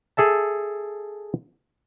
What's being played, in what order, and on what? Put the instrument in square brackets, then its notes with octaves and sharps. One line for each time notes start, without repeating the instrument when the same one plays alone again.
[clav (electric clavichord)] G#4 A4 E5 A5